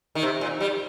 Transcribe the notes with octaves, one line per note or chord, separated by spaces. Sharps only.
D#3
C3
A#2
G3